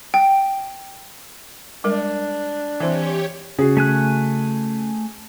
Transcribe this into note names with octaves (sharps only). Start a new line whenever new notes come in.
G5
G3 G#3 D4 A#4
E3 C4 G4 C#5
C#3 F#4 G#4
A3 G#5 F#6